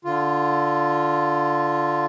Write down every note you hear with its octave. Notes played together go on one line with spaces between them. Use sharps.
D3 F4